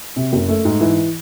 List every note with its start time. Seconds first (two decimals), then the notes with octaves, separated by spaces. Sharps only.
0.16 C3
0.33 F#1
0.49 A3
0.65 G#2
0.81 E3